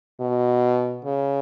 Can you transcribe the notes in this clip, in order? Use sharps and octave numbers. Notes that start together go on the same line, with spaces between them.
B2
C#3